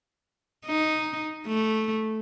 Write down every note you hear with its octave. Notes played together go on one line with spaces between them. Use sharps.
D#4
A3